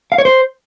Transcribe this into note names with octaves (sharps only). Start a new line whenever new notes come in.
F5
C#5
C5